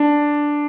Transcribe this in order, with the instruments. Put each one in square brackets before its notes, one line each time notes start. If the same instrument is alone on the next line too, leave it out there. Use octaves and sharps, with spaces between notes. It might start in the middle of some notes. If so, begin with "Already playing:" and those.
Already playing: [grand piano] D4